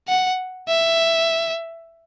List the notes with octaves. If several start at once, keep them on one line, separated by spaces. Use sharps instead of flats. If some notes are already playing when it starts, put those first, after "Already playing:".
F#5
E5